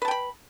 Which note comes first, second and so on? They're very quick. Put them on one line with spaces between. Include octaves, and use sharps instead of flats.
B4 A5 G5 B5